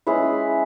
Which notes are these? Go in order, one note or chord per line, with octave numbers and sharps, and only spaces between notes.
G#3 C#4 E4 G#4 B4